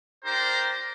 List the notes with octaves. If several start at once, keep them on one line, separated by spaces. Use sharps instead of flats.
D4 G4 A#4 C5 A#5